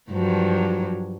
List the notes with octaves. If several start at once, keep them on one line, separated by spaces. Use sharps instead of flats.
G2 F3 F#3